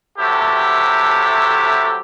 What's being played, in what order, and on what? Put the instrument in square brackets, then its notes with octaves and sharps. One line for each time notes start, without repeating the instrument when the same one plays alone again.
[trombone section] C3 F#3 A3 E4 G4 A4